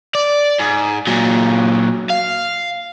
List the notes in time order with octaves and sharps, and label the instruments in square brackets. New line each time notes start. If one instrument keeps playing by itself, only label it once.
[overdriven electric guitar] D5
G#2
A#2 F#3
F5